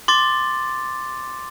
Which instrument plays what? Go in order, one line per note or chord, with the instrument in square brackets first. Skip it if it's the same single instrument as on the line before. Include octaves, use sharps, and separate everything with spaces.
[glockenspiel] C6 D6 A6